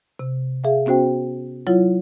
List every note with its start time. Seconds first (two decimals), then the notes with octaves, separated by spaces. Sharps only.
0.19 C3
0.64 G#4 E5 F5
0.86 B3 C#4 F#4 C5 G5
1.67 F#3 E4 F4 C#5